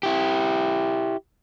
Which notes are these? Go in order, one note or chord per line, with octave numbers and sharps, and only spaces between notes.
E4 G4